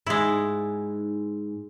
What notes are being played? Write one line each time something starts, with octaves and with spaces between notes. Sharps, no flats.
G#2 G#3 E4